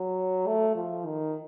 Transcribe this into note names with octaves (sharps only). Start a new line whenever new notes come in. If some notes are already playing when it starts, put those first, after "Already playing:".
Already playing: F#3
A3
F3
D#3